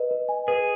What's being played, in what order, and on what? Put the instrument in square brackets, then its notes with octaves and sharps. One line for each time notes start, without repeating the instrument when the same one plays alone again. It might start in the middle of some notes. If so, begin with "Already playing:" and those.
Already playing: [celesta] B4 D#5
B4
G#5
[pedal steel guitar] G#4 [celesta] B4